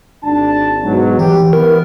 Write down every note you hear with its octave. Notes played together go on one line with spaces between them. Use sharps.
G#1 D4 A5
G#2 B2 F#3
E3 G4
E3 B3 A#4